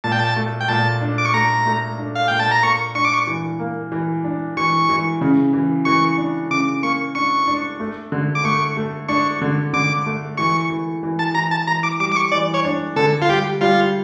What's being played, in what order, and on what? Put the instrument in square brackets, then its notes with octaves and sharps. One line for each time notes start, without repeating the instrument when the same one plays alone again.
[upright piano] A#2 [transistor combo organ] A5
[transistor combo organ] G5
A5
[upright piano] A3
[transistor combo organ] G5
[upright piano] A#2 [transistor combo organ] A5
[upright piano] D4
[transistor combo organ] D6
C#6
[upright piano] A3 [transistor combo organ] A#5
[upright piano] A3
D4
[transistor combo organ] F5
[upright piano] A#2 [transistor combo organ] G5
[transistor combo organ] A5
A#5
[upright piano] A#3 [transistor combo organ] C#6
[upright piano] D4 [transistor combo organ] C#6
[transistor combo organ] D6
C#6
[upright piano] E3
A#3
E3
D4
[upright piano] E3 [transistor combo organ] C#6
[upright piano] E3
C#3
E3
[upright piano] E3 [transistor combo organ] C#6
[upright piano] D4
[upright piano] C#3 [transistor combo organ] D6
[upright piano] A#3 [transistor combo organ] C#6
[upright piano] D4 [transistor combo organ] C#6
[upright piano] D4
A3
D3
[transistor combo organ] D6
[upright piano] A3 [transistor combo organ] C#6
[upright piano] A3
[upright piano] D4 [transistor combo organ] C#6
[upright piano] D3
[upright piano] D3 [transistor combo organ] D6
[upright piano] A3
[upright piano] E3 [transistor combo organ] C#6
[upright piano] E3
E3
[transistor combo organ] A5
[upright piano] E3 [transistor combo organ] A#5
[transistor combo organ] A5
[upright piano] E3 [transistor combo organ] A#5
[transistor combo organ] D6
[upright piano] G3 [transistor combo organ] D6
[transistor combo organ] D6
C#6
[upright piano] E3 [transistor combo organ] D5
[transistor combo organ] C#5
[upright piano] D4
[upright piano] D3 [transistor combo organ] A4
[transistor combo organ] F4
[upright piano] G3 [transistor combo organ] G4
[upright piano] G3 [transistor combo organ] F4